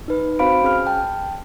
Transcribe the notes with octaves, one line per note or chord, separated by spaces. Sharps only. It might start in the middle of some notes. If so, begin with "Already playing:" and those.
D#4 B4
C4 F#4 C5 F5 B5 D7
C#4 G#4 F6
G5 A5